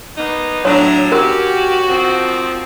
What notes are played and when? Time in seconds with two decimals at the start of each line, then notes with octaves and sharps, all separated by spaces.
0.17 A#3 B3 D#4
0.65 A2 F#3 D4 C#5 A5 A#5
1.12 C#4 F#4 G4 A#4
1.88 D#3 F3 C4